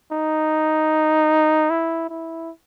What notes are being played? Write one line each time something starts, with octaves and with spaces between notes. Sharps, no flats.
D#4
E4
E4